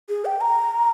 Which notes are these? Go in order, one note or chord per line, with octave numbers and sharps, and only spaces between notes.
G#4
G5
A#5